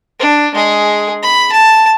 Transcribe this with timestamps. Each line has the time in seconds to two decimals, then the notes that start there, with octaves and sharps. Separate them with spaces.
0.20 D4
0.54 G#3 G#4
1.23 B5
1.52 A5